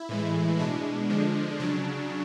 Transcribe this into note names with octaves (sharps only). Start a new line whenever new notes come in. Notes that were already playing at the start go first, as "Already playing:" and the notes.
Already playing: E4
A2 E3 G#3
B2 G#3 D4
D3 F3 G#3
C#3 F#3 D4